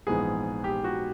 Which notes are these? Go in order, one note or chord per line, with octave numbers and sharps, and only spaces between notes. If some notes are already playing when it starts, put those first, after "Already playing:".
A#1 G#2 E3 G#3 B3 G#4
G4
F#4